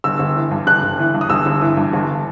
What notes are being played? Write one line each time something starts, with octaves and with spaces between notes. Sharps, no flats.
G1 E6
G1
E3
G2
G1 F#6
G1
E3
G2
D#6
G1 E6
G1
E3
G2
G1